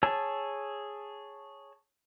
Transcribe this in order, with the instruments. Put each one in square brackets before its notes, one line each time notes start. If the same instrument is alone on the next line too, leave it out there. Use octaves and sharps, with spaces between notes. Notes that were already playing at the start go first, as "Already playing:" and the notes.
[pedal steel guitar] G#4 C#5 A5 E6